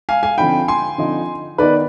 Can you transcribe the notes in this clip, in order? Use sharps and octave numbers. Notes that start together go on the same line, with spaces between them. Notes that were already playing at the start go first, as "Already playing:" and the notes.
F5 G#5
F5 G#5
D3 F3 C4 D#4 G5 B5
G#5 C6
D3 F3 C4 D#4
D#3 B3 D#4 B4 D5